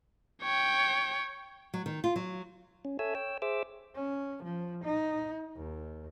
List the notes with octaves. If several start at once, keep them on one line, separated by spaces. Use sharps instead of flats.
C#5 G5
F#3
D#3
F4
F#3
C#4
A4 C#5 E5 G#5 E6
C#5 G5 E6
G#4 C5 E5 D6 E6
C#4
F3
D#4
D#2